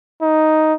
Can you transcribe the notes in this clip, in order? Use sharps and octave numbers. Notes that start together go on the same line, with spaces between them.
D#4